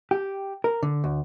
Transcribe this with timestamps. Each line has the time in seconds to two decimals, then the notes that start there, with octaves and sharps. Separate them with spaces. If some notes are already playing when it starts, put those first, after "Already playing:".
0.11 G4
0.64 A#4
0.83 D3
1.04 D2